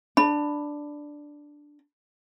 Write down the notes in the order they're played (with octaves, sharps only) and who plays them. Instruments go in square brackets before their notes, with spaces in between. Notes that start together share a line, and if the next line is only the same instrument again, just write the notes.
[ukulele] D4 [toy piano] B5